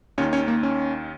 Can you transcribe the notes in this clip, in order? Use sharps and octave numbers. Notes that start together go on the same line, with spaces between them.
D#2 D#3 C#4 C#5
C#4 C#5
A#3
C#4